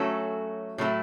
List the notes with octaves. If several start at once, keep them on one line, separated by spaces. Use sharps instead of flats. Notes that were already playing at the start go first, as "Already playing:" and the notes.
Already playing: F#3 A3 C#4 F#4 A4
A2 F#3 A3 E4